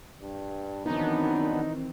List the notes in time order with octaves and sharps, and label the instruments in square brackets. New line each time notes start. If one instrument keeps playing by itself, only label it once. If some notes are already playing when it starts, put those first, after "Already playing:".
[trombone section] G2
[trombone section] F#2 D4 [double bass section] D#3 E3 C4 [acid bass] B3 [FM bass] D#4